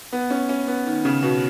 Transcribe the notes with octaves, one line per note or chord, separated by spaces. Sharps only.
B3
C#4
C#4
B3
D#3
C#3
B2